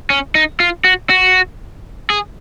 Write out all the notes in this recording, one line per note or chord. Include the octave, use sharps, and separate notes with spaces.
C#4
D#4
F4
F#4
F#4
G#4